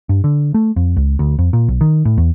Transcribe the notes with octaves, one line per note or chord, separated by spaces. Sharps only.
G2
D3
A3
F2
C#2
D2
F2
A#2
B1
D#3
A2
E2